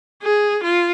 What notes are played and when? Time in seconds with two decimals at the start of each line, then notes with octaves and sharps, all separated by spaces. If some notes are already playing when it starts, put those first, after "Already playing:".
0.22 G#4
0.64 F4